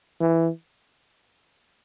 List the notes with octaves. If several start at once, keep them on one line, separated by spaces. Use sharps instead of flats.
E3